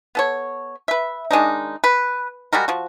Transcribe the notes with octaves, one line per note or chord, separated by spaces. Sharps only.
B3 A4 C#5
B4 E5
D#3 G#3 D4 D#4
B4
G3 G#3 F#4 A#4
F3 F#4